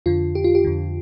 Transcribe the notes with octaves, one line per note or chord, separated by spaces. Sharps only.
F2 D3 F4
G4
F4
G4
F2 D3